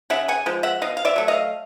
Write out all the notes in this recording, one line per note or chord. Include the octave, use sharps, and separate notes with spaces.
C#3 E5 F#5
F#5 G#5
F3 G#3
E5 F#5
B2 D#5 F5
F5
D5 E5
F#3 A3
D#5 F5